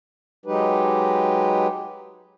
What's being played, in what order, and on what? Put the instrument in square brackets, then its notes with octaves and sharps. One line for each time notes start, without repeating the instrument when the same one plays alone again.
[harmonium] F#3 G#3 D#4 G4 B4